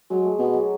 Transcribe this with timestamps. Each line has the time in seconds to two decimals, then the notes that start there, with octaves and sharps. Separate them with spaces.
0.10 F#3 G#3
0.25 A3
0.38 B2 G#3
0.53 F#3